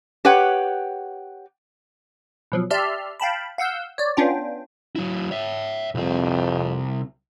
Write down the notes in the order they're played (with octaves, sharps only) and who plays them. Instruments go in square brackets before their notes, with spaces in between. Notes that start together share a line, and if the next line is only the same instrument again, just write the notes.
[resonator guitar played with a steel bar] G4 B4 C#5 F#5 G5
[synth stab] B2 F3 F#3
G4 D5 E5 A5 C6 F6
F5 G5 A5 B5
F5 F#5 E6 G6
C#5 D5
B3 C#4 D4 F4 G5
[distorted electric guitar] F#3 E4
C#5 E5
[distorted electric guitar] C2 C4 [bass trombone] F2